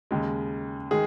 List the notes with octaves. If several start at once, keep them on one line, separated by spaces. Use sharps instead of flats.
D#2 C#3 G#3
D#3 G#3 G#4